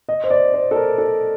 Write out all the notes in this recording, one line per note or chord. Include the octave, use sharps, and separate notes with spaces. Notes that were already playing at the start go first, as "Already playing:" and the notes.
D#5
C5
D5
C5
A4
A#4
A4